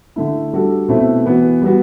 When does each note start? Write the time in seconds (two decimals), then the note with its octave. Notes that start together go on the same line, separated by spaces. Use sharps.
0.16 D3 A3 E4
0.53 G3 D4 F#4 A4
0.88 B2 A3 C4 E4
1.26 E3 B3 F#4
1.62 G3 B3 F#4